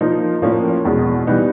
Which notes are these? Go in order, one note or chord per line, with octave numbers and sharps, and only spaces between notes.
F3 A#3 D#4
A2 F3 A#3 C#4
E2 B2 G#3
E3 G3 B3 D#4